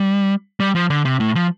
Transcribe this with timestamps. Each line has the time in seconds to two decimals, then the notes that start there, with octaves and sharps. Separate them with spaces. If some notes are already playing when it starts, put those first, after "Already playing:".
Already playing: G3
0.60 G3
0.75 F3
0.90 D3
1.05 C3
1.20 A2
1.35 F3